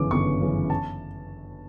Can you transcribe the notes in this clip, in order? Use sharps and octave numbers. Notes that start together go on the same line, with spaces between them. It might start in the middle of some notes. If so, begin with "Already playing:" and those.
Already playing: G1 F#2 C#3 E3 D6
G1 C#6
F#2 C#3 E3
A5